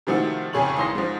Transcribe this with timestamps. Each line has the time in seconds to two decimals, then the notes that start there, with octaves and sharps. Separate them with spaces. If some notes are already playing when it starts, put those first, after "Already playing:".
0.07 C3 D#3 F3 A3 E4 F#4
0.53 B1 F2 C#3 G#4 C#5 F#7
0.76 G#1 E3 C6 D#6 A#6
0.95 G#2 F3